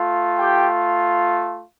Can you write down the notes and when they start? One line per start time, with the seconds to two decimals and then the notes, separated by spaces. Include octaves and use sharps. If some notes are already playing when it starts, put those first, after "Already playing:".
Already playing: A3 F4
0.37 G4 G5